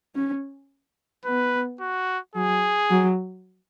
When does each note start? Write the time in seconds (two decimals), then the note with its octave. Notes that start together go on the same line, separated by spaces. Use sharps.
0.15 C#4
1.25 B3 B4
1.80 F#4
2.35 F#3 G#4
2.90 F#3